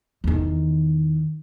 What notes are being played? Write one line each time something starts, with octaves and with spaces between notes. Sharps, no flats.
E2 D#3